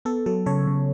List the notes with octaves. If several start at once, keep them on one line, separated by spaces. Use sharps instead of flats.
B3 A4
F#3 A4
C#3 A4 C#5
C#3